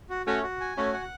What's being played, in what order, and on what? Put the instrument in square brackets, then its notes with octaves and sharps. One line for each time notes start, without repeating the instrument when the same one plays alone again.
[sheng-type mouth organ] F#4
[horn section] A3 C#4 [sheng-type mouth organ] F#4
[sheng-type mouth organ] F#4
G#5
[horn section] A3 C#4 [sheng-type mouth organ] F#4
[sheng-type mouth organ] F#5